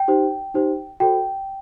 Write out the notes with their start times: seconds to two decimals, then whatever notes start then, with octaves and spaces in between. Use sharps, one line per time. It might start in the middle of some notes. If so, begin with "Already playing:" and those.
Already playing: G5
0.08 D#4 G4 C5
0.54 D#4 G4 C5
1.00 F#4 A4 C5 G5